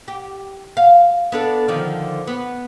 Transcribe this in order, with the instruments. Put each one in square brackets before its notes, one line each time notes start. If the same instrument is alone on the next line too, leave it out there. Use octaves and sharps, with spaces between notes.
[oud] G4
F5
B3 D4 A4
D3 D#3 F3
B3